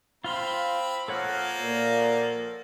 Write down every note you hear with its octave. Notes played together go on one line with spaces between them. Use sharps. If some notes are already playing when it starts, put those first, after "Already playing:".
C4 F4 F5 B5 C6
F3 A#3 A4 C#5 F#5
A#2